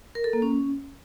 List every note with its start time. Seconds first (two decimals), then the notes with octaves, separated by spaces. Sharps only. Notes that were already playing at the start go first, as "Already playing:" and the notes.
0.15 A#4
0.24 A4
0.33 A#3
0.42 C#4